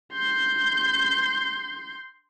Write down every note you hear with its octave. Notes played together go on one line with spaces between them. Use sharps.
C6 G6